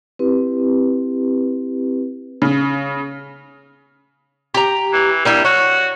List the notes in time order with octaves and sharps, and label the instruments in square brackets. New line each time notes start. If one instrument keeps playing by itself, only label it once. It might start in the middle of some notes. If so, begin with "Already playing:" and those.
[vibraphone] C4 E4 G4 B4
[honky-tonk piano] C#3
[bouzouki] G4 A#5
[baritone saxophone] E3
[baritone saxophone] G3 [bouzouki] A#3 D4 E4
[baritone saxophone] F#4 [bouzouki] C#5